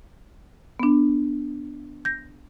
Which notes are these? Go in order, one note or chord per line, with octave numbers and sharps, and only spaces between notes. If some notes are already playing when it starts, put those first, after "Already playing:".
B3 D4
G6 A#6